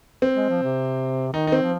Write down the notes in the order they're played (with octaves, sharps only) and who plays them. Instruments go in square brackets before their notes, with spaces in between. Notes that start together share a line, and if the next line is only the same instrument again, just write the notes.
[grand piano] C4
[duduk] G#3
F3
C3
[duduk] D#3 [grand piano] D#4
[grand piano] D#4
C4
[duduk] F3